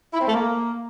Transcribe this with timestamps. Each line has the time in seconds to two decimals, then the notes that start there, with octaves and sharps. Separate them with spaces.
0.12 E4
0.19 C4
0.26 A3
0.33 A#3